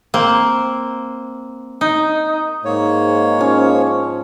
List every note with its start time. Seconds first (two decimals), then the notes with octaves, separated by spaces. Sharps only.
0.14 A#3 C4
1.81 D#4
2.65 G#2 A#3 C#5
3.39 F3 C#4